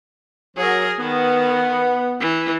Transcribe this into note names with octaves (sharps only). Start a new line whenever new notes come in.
F#3 G#4 A#4
D#3 B3
E3